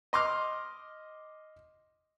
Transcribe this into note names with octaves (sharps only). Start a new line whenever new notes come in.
D#5 C6 D6 F6